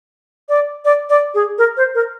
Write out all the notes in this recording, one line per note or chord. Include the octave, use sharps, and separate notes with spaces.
D5
D5
D5
G#4
A#4
C5
A#4